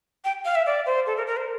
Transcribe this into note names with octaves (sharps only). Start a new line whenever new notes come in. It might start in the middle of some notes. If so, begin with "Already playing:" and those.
G5
F5
E5
D5
C5
A4
A#4
A#4
C5